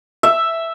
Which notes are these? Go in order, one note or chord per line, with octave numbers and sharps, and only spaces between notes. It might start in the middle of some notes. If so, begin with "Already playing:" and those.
E5